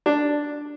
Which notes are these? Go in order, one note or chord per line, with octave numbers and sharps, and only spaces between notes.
D4